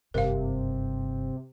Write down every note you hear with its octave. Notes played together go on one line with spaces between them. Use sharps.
F#1 G2 C3 A#4 F5